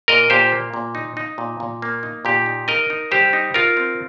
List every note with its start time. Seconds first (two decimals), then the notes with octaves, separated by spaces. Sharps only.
0.08 A#2 A#4 D#5
0.30 A#2 G4 C5
0.52 A#3
0.74 A#2
0.95 D#4
1.17 D#4
1.38 A#2
1.60 A#2
1.82 A#3
2.03 D#4
2.25 A#2 G4
2.46 D#4
2.68 D#4 A#4 D#5
2.90 D#4
3.11 G3 G4 C5
3.33 D#4
3.54 D#4 F4 A#4
3.77 C4